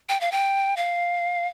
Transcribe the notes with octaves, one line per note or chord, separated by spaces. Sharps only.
G5
F5
G5
F5